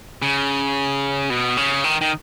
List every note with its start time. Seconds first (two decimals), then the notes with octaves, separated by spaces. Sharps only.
0.22 C#3
1.30 B2
1.57 C#3
1.84 D#3
2.01 D#3